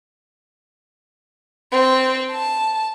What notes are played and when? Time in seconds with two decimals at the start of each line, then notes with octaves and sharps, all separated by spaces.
1.73 C4
2.31 A5